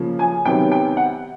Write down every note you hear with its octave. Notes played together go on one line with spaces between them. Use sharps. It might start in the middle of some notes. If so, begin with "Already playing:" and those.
Already playing: C#3 F3 A#3 C#4
G#5
C3 D#3 F#3 B3 G5
G5
F#5